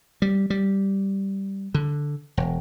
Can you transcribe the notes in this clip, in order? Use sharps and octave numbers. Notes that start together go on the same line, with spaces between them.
G3
G3
D3
E1